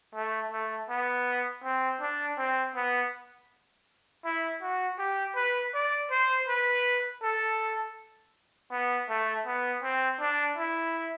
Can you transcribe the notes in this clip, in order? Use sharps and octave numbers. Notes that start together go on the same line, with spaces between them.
A3
A3
B3
C4
D4
C4
B3
E4
F#4
G4
B4
D5
C5
B4
A4
B3
A3
B3
C4
D4
E4